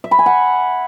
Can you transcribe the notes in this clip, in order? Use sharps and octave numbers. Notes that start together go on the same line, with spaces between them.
E5
B5
G#5
F#5